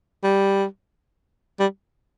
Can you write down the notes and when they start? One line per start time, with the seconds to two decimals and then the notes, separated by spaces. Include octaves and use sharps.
0.24 G3
1.60 G3